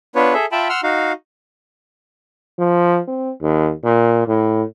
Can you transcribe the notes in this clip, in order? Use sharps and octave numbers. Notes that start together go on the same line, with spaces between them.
B3 D4 F4 B4 C#5
G#4 A4 E5
F4 E5 G5 A5 B5
F#5 C6 E6 F6
D#4 F#4 F5
F3
C4
D#2
A#2
A2